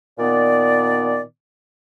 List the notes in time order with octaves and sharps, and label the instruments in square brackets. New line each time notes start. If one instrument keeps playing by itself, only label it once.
[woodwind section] A#2 D#3 B3 D5